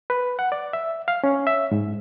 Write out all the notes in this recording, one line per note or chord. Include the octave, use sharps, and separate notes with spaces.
B4
F#5
D5
E5
F5
C#4
E5
G#2